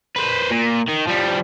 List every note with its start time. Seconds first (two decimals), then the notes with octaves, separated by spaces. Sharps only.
0.16 B4 C5
0.50 A#2
0.88 D#3
1.07 F3 G3